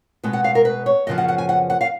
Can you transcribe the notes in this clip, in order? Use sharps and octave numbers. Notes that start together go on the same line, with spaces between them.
B2 G#3 B3
F#5
F5
A#4
B4
C#5
F#2 C#3 F3 B3 D#5
F#5
F#5
G#5
F#5
F#5
F5